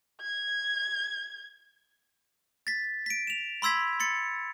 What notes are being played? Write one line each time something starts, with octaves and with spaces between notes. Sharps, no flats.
G#6
A6 B6
B6 D7
E7 F7
B5 C6 E6 G#6 B6
C6 A6 C#7